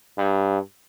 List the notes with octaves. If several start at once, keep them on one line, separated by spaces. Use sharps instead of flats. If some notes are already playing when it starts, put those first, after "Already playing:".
G2